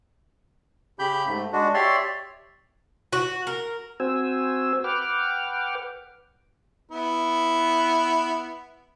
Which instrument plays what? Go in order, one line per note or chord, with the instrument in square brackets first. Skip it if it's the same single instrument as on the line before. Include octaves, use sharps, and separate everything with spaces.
[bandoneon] C#3 G4 B5 G6
G#2 A3
G#3 D4 F#4
G4 C#5 D5 E5 C6
[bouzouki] F#4
A#4
[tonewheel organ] C4 F#4 C5 G#5 E6
B4 F#5 G5 D6 F6
[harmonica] B3 E4